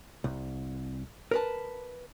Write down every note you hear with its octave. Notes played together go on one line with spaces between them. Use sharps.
C2
A#4 B4 A5